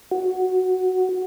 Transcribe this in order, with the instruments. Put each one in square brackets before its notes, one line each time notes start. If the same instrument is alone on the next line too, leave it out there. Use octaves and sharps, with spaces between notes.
[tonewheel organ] F#4